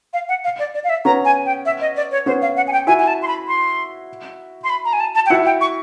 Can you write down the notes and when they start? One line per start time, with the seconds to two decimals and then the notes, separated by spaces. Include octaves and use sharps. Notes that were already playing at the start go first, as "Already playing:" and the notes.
0.13 F5
0.29 F#5
0.44 F5
0.59 D5
0.74 D5
0.84 F5
0.89 E5
1.05 B3 C#4 A#5
1.25 G#5
1.46 G5
1.66 E5
1.81 D#5
1.96 D5
2.12 C#5
2.26 B3 C#4 C5
2.42 F5
2.57 F#5
2.67 G#5
2.72 G5
2.87 E4 F#4 G#5
2.99 G#5
3.07 A5
3.22 C6
3.28 B5
3.48 C6
4.64 C6
4.70 B5
4.85 A#5
4.93 G#5
5.00 A5
5.15 A5
5.26 G5
5.30 E4 F#4 F#5
5.46 G5
5.61 C#6